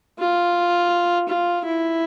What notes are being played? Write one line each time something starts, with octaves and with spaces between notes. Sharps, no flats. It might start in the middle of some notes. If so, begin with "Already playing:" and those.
F4
F4
E4